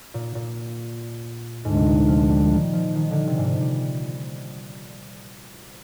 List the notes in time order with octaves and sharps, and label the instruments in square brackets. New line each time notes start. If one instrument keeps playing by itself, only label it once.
[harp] A#2
A#2
[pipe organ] D2 D3 G#3 D4 [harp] G#2
[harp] C3
A#2
F3
G3
D#3
F3
D#3
D3
C3
G#2
A#2
G3